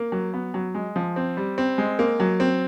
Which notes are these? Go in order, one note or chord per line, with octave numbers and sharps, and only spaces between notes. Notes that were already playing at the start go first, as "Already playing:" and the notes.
Already playing: A#3
F#3
B3
F#3
G#3
F3
C4
G3
C4
G#3
A#3
F#3
C4